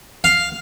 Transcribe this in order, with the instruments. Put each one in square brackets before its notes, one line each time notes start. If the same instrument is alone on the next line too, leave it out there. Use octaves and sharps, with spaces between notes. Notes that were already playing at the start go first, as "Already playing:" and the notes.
[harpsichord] F5